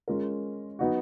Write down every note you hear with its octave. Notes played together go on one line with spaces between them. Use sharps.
G#3 C#4 F4 A#4
F#3 B3 D#4 F#4